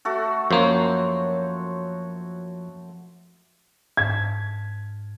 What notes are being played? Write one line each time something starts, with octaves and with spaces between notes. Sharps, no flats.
A3 F#4 A4
F#2 F3 A#3 C5 C#5
G#2 A5 G#6 B6